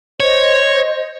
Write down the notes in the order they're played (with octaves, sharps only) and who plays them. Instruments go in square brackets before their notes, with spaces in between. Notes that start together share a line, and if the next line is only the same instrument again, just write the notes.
[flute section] C5 D#5 [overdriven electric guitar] C#5